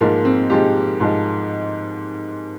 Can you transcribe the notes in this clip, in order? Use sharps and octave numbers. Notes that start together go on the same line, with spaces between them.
G#2 F3 G#3 A#3
C4
G#2 F3 G#3 G4
G#2 F3 G#3